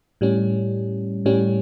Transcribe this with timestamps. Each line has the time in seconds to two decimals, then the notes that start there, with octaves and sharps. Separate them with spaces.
0.21 A2 G3 C#4
1.25 A2 G3 C#4